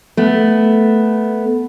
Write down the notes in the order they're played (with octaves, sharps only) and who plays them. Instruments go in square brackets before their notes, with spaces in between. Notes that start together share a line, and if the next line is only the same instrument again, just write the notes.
[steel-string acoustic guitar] A3 B3